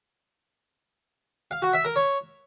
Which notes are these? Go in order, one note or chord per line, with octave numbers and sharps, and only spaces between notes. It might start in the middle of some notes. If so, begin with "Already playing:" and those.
F5
F#4
E5
A#4
C#5